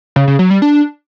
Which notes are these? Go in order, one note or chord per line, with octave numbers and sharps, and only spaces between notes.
C#3
C#3
F#3
G3
D4